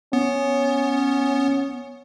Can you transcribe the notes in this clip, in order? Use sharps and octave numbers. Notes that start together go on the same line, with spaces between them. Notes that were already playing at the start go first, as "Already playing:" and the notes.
B3 C#4